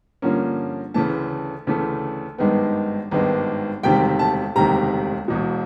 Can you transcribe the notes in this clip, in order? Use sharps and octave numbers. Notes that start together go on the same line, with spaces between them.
G2 D3 F3 A#3 C#4
D2 C#3 E3 A3 A5
D2 C#3 E3 A3
G#1 G2 D#3 G#3 B3
G#1 G2 D#3 G#3 B3
E1 D2 C3 D#3 G3 G5
A5
E1 D2 C3 D#3 G3 A#5
E1 E2 B2